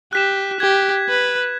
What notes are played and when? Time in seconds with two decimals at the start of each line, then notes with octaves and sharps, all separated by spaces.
0.13 G4 F#6 B6 E7
0.60 G4 G#6
1.09 B4